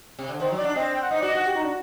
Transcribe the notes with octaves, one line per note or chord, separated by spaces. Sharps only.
C3
D3
D#3 C5
F#3
D5
D4
C4 D#5
G5
F#5
D#4 D#5
F#4 D5
D#5
F#4 F#5
G4
D#4
D4